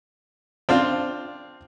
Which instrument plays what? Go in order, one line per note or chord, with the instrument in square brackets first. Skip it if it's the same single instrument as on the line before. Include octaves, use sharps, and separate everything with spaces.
[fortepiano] C4 D4 F4